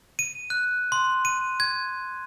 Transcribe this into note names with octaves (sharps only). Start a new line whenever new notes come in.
D#7
F#6
C6
D#7
G#6